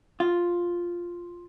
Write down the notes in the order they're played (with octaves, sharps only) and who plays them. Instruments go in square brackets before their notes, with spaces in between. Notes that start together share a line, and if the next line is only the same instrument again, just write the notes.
[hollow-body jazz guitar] F4